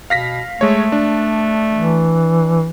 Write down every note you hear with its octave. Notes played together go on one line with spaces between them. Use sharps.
B2 F5 A#6 B6
G#3 A3 C#5
D4
E3